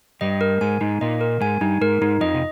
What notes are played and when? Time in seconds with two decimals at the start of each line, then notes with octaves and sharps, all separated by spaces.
0.21 G2 G3 D#5
0.41 A#4
0.61 G#2 G#3 G#5
0.81 G#2 G#3 D#4
1.01 A#2 A#3 D#5
1.21 A#4
1.41 G#2 G#3 G#5
1.61 G2 G3 D#4
1.81 G#2 G#3 A#4
2.01 G#2 G#3 D#4
2.21 F2 F3 D#5
2.34 C3